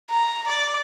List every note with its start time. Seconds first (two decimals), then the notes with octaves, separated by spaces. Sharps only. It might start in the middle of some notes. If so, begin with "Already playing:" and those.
0.10 A#5
0.48 D5